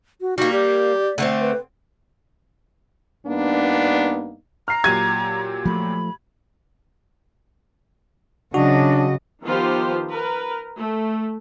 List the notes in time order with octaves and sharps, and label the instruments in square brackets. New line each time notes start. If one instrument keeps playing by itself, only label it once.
[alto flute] F#4
[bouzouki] G3 A#3 [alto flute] D#4 [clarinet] F#4
[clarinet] G4 [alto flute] D5
[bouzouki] D3 A#3 C4 [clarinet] A3
[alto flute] B4
[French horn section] G2 A#3 B3 D4 D#4
[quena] A#5 [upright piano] F6 C7
[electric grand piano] A#2 F#3 G4 [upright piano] G#6 D#7
[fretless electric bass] F3 A3 [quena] B5
[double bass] C#3 [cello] F#3 D#5 [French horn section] D4 [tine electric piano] F#4
[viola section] D#3 F3 B3 F4 G4 C5
A#4 B4
A3